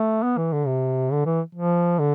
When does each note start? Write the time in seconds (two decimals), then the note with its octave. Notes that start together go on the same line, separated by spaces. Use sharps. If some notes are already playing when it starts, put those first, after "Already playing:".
Already playing: A3
0.23 B3
0.37 E3
0.53 D3
0.67 C3
1.12 D3
1.26 E3
1.55 F3
1.99 D3